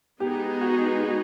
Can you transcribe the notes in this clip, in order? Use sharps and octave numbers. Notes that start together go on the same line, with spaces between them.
G#3 B3 D#4 G4 G#4
F#4
F#4